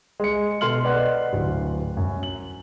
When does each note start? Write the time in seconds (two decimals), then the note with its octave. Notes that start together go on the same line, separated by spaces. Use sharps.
0.20 G#3 C#7
0.61 B2 A4 C6 F6 F#7
0.84 B4 D5 D#5 F#5 C6 F#6
1.33 D1
1.97 F#2
2.23 F#7